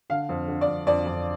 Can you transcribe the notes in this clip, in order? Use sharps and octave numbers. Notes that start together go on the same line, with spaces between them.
D3 F5
F2
D3
D5
F2
F2 D5
F2